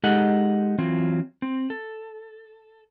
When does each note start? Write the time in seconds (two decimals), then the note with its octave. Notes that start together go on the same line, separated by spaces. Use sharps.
0.04 G#3 D#4 G4 A4 D#5 F#5
0.78 E3 F#3 C4 F4
1.42 C4
1.70 A4